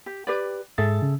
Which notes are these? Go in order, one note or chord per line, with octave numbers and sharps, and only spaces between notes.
G4
G4 B4 D5
G#2 G#4 A4 E5 A6
C#3